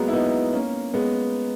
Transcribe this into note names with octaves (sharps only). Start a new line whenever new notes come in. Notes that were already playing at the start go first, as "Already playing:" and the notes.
Already playing: F#3 G#3 A#3 B3
E4
B3 D#4
A#3 C#4
G#3 B3